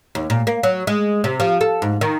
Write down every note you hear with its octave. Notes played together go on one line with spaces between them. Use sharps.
D#2
A#2
A#3
F#3
G#3
C3
F3
A4
G#2
D#3